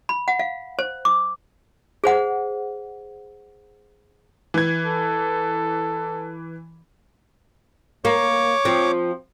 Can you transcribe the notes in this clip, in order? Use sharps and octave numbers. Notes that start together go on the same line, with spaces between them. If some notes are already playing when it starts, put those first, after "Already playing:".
B5
F#5
F5
C5
D6
G#4 C5 F#5
E3 G#6
A4
A#3 C#5 C#6 D6
F3 C4